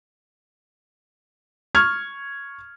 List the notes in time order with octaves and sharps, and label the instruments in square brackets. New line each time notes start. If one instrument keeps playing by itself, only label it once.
[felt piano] C#6 F6 G#6